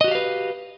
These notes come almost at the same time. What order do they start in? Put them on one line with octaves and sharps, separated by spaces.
D#5 F#4 G4 F5 B4